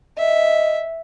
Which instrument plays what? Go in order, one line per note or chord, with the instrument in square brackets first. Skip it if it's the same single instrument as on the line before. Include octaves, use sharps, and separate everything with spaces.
[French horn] D#5 [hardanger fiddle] E5